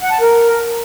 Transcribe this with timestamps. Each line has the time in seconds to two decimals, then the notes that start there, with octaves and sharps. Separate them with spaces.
0.01 F#5
0.11 A5
0.21 A#4